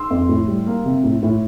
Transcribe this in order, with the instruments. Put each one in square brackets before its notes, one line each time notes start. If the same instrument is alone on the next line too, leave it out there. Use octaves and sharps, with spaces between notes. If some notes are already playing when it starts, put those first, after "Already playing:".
Already playing: [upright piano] C6 E6
F2
A2
G3
A#3
C3
A2
A2